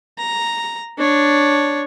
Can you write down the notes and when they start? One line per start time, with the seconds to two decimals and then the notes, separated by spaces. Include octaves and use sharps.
0.18 A#5
0.98 D4 C#5